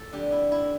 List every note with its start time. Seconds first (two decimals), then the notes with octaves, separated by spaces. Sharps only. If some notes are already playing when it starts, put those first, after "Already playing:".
Already playing: A2 A4
0.13 F2 D3 G4
0.32 E4
0.52 E4